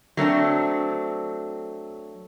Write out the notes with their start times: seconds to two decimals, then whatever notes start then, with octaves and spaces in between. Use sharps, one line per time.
0.17 F#3 A3 C4 D4